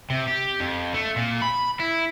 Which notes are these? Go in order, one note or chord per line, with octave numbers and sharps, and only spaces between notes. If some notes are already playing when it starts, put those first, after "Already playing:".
C3
G4
F2
A3
A#2
B5
E4